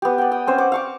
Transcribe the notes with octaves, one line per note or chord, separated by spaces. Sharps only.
B3 G4
D5 G5
G5 D#6
C4 C#4 C5 C#5
F#5 D6
F5 C#6 D6